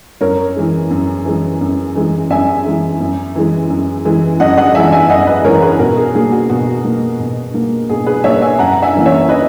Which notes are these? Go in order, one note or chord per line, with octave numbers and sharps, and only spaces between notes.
F#2 A#4 C#5
E3 G#3
F#2
E3 G#3
F#2
E3 G#3
F#2 E5 G#5
E3 G#3
F#2
E3 G#3
F#2
E3 G#3
F#2 D#5 F#5
D#5 F#5
E3 G#3 E5 G#5
E5 G#5
F#2 D#5 F#5
B4 D#5
E3 G#3 A#4 C#5
G#4 B4
B2 F#4 A#4
G#4
A#3 G#4
F#4
B2 F#4
A#3
B2
A#3
B2 G#4
G#4 B4
A#3 C#5 E5
E5 G#5
F#2 F#5 A#5
E5 G#5
C#3 E3 A#3
C#5 E5
B4 D#5